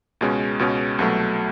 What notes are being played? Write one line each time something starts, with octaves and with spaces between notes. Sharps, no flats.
C#2 B2 G#3 C#4
C#2 B2 G#3 C#4
C2 B2 F#3 A3